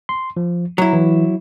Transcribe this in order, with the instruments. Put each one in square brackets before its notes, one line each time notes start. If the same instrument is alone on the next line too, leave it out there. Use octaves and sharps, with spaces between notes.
[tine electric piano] C6
F3
[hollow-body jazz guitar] F#3 E4 [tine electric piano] A#5
[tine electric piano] E3